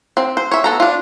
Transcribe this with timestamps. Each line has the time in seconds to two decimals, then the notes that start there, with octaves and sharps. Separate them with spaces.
0.17 C4
0.37 C5
0.51 C#5 E5
0.64 B3 A4 A#5
0.80 D4 F4